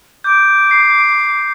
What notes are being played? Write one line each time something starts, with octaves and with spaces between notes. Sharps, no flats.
D6 G6
C7